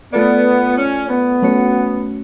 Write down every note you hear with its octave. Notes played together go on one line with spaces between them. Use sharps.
A3 B3 F4 A4 D5
C#4
B3
F#3 A3 C#4 F#4 C#5